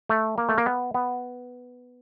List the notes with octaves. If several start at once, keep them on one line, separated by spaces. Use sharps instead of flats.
A3
A#3
A3
A#3
B3
B3